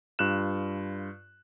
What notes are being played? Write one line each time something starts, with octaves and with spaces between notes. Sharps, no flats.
G2 F4 F#6 E7